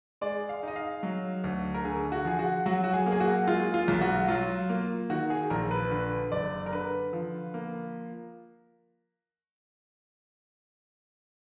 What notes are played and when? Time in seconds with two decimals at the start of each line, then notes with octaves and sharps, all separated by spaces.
0.21 G#3 D5
0.49 F5
0.63 D#4 D#5
0.76 F5
1.03 F#3
1.44 D2
1.74 A#4
1.84 D3 G#4
2.12 F#4
2.25 F3 G#4
2.39 F#4
2.66 F#3 F#4
2.84 F#4
2.93 G#4
3.06 A#3
3.12 G#4
3.20 F#4
3.47 G#3 F4
3.74 F4
3.88 B1 F4
4.01 F#4
4.28 F#3 F4
4.69 A#3
5.10 D#3 F#4
5.30 G#4
5.50 A#1 A#4
5.71 B4
5.91 D3 B4
6.32 F#1 D5
6.66 A#4
6.73 D3 B4
7.13 F3
7.54 A#3